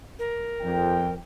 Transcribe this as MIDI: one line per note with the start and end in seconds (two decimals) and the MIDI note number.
0.19 1.14 70
0.61 1.14 41
0.61 1.14 79